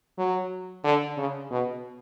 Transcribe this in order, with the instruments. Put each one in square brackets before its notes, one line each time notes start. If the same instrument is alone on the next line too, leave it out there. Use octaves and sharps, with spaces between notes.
[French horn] F#3
D3
C#3
B2